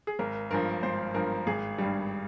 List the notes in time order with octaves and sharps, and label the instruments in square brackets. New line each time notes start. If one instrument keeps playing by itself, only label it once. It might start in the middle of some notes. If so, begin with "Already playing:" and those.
[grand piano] G#4
G#1 A#4
G2 F3 A#4
G#1 C5
G2 F3 A#4
G#1 G#4
G2 G3